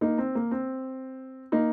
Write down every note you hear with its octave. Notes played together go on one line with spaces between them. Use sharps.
A#3 D#4
C4
A#3
C4
A#3 D#4